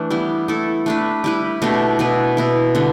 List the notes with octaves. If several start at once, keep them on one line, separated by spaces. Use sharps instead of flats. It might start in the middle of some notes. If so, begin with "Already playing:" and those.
Already playing: E3 A3 D4
G3 B3 E4
A3 E4 A4
A3 D4 B4
G3 E4 B4
B2 A3 D4 G4
B2 B3 E4 B4
B2 B3 E4
D3 G3 B3